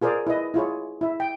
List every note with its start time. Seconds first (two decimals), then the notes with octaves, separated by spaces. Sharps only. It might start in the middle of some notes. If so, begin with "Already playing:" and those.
0.02 F4 G#4 A#4 C5 D5
0.27 E4 B4 D#5
0.54 E4 F4 G#4 C#5
1.01 E4 E5
1.20 G5